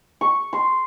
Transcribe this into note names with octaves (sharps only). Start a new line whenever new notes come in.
C#6
C6